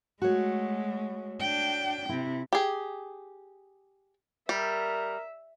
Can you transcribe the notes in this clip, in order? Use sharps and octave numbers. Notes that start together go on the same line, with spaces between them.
G#3 A3 F#4 C#5
D4 G5
C3 E4
G4 G#4
G3 A#4 E5